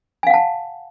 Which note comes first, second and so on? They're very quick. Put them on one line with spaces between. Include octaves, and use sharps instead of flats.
G#5 F5 F#5 A5